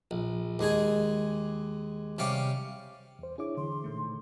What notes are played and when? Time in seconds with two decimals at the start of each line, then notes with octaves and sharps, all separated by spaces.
0.11 A#1
0.59 D#2 G#3 G#4 G#5
2.18 C3 G3 C#4 F5 D6
3.19 E2 C5
3.38 D4 E4 G#4 C#5 D6
3.57 D3 E3 C6
3.84 A#2 D#3 A3